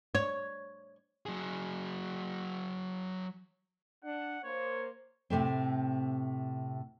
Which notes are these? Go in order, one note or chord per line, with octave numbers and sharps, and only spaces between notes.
C#5
F#3 G#4
D4 F#5
A#3 C5 C#5
A2 C3 A3 C4